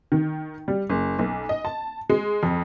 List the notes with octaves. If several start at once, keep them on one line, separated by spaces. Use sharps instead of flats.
D#3
G3
F#1
B1
D#5
A5
G#3
F2